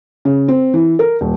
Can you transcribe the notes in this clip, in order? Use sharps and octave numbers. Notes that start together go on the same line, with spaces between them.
C#3
C4
E3
A#4
D#1